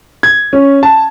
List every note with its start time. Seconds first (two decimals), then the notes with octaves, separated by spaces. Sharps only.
0.23 G#6
0.53 C#4
0.83 A5